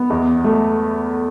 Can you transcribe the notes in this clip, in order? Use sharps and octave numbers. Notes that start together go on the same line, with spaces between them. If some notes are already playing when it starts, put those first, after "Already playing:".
Already playing: B3
E2
A3